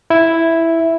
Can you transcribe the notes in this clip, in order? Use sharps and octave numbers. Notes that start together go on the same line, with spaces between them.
E4